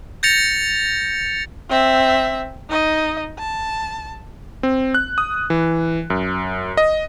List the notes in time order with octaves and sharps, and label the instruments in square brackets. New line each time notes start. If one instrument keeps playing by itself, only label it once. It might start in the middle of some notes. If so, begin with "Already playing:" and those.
[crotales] G6 A6 A#6 C#7 F7
[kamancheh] C4 E5
D#4 D#5
A5
[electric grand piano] C4
F#6
D#6
E3
F#2
D#5